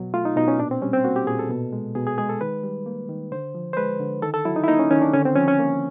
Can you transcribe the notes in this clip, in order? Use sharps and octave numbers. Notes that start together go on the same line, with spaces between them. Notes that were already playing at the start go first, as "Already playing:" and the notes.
Already playing: B2 F#3
A3 F4
D#4
B2 D#4
C#4
A#2 D4
C4
G3 C#4
C4
A#3 F#4
G4
A#2 G#4
A4
B2
G#3
B2 G#4
G#4
G#3 G#4
A4
D#3 B4
G3
A#3
D#3
D3 C5
F3
C5
G#3 B4
D3
D#3 A4
A4
F#3 E4
D#4
E4
A#3 D#4
C#4
D#3 C#4
D4
D3 C#4
C4
F3 C#4
C#4
A#3